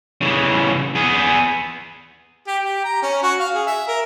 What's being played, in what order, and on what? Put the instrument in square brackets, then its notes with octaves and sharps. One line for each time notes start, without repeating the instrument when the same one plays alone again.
[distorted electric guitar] C#3 E3
B3 G#4
[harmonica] G4
G4
A#5
C#4
F#4
F5
G#4
E5
A#4